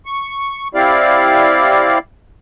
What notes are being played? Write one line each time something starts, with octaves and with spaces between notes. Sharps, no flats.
C#6
C4 E4 G4 D5 F5